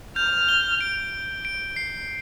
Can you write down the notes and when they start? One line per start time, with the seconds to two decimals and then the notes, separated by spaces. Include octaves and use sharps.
0.16 F6 G6
0.48 G7
0.81 D7
1.45 D7
1.76 C7